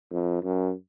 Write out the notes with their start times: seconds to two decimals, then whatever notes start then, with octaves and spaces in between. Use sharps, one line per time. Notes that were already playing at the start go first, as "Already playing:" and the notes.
0.11 F2
0.43 F#2